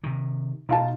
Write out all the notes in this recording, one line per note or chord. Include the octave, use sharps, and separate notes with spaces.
C3 D#3
B2 D#4 F4 A5